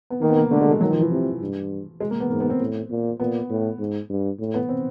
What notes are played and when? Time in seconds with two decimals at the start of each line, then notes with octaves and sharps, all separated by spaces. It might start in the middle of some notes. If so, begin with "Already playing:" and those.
0.10 B3
0.21 D#3 A#3
0.29 B3
0.36 A#3
0.51 D3 A3
0.61 G#3
0.71 G#3
0.81 D#3 F#3
0.91 F3
1.01 E3
1.10 C3
1.41 G2
2.00 G#3
2.11 A#3
2.20 B3
2.30 G#2 A#3
2.40 B3
2.50 C4
2.60 A2
2.91 A#2
3.19 A#2 B3
3.50 A2
3.79 G#2
4.10 G2
4.39 A2
4.54 B3
4.69 C4